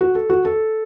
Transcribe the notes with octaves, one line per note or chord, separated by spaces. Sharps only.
F#4
A4
F#4
A4